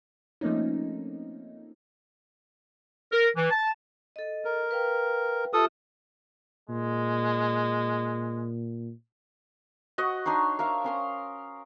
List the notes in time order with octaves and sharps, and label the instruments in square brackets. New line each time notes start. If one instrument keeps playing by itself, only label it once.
[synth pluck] F3 A3 A#3 C4 C#4 D#4
[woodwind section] A#4
E3
A5
[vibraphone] A4 D#5
[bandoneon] A#4
[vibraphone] B4 F5 G5
[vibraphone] F4 G4 E5 [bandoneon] A4 D#6
[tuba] A#2 [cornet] G#3
[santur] F#4 D#5 F#5
D4 D#4 C#5 C6
A#4 E5 F5
C#4 C6 D#6